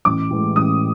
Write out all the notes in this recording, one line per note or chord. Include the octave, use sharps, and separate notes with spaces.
A1 D6
A2 E3 G#3
A1 D#6